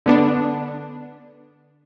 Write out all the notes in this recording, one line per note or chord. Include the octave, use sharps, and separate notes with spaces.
D3 B3 D4